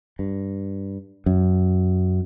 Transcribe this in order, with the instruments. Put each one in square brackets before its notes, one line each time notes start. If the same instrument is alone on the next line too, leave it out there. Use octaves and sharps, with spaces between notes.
[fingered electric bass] G2
F#2